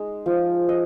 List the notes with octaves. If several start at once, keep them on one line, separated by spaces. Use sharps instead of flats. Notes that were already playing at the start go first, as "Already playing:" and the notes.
Already playing: G#3 D#4 G#4
F3
D#5